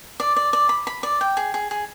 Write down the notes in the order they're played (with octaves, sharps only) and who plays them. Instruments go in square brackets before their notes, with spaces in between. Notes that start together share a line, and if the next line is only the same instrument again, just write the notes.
[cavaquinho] D5
D5
D5
B5
B5
D5
G5
G#4
G#4
G#4